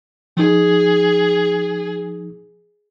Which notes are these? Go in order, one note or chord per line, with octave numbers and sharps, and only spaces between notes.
F3 D#4 G#4